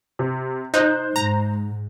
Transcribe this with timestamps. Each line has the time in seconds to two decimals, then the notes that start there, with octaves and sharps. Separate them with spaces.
0.19 C3
0.74 D#4 C5 F#6 G6
1.16 G#2 A#5